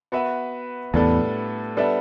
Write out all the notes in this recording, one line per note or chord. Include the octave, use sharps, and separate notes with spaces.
B3 F#4 B4 E5
E2 A2 G3 B3 D4 A4
G3 B3 D4 A4 E5